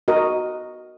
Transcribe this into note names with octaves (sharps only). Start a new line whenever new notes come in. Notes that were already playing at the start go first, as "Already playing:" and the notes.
F#4 A#4 D#5